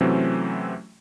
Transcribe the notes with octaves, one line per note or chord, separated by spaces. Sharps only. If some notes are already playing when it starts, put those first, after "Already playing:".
C3 E3 F#3 A3 C4 C#4